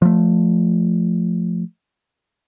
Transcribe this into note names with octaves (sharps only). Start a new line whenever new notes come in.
F3 A3